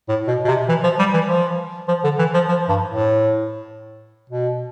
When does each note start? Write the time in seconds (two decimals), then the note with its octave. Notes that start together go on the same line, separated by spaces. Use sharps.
0.09 A2
0.28 B2
0.45 B2
0.48 C3
0.69 E3
0.83 F3
0.99 G3
1.14 E3
1.28 F3
1.88 F3
2.04 D3
2.19 E3
2.34 F3
2.48 F3
2.68 G2
2.89 A2
4.30 B2